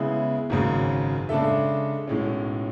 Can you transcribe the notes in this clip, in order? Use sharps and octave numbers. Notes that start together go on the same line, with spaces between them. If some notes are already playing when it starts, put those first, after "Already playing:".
Already playing: C#3 G#3 B3 E4 G#4
G#1 F#2 C#3 G#3
C#3 G#3 D4 A4 E5
B1 A2 G#3 C#4